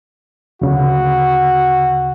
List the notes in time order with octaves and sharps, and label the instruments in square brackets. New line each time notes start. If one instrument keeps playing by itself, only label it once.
[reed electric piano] D2 C#3 [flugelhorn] F#4